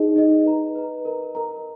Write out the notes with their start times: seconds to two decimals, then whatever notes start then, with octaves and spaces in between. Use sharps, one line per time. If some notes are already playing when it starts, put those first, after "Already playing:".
Already playing: D#4 G#4 D#5
0.16 D#4 G#4 D#5
0.44 B4 D#5 A#5
0.75 B4 D#5 A#5
1.05 A#4 D#5 A#5
1.35 A#4 D#5 A#5